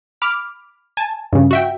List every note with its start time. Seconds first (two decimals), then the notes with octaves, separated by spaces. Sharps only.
0.22 B5 D6 F6
0.97 G#5 A5
1.33 G2 C#3
1.51 F#4 E5 G5